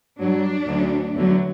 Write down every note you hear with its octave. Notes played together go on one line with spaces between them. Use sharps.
G2 F#3 D4
D2 D3 F#3
E2 D3 F#3